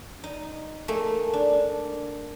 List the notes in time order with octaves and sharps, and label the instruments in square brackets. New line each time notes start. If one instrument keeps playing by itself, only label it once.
[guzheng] D#4
A3 A#3 G#4
D4